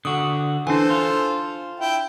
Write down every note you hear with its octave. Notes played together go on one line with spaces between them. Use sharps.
D3 F#4 D#6
E3 D4 A4 C5 G#5
F4
E4 G5